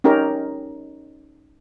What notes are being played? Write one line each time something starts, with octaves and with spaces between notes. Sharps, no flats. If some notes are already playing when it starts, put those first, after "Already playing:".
C#4 D#4 G4 A#4